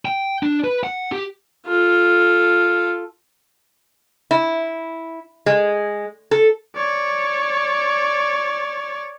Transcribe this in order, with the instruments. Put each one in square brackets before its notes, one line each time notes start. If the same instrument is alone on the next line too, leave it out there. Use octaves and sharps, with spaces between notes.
[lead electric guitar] G5
D4
B4
F#5
G4
[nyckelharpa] F4 A4
[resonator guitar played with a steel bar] E4
G#3
A4
[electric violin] C#5 D5